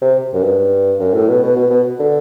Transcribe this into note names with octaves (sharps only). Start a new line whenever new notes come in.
C3
F#2
G2
F#2
A2
B2
B2
B2
B2
D3